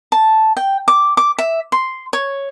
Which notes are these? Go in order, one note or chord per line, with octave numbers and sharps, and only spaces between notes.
A5
G5
D6
D6
E5
C6
C#5